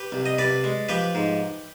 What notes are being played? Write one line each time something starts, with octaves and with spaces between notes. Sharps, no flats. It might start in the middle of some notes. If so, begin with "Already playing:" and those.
Already playing: G4 B4
C2
D#5
C2 B4 D5
G#3
F3 G4 B4
G#2